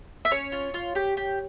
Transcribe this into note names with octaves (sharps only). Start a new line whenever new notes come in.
E5
C#4 C#5
F4
F4
G4
G4